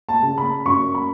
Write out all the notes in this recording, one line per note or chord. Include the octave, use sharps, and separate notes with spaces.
A5
C#3
B5
F#2 C#6
B5